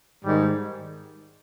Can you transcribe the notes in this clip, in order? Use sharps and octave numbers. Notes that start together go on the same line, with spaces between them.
G#2 D#3 G3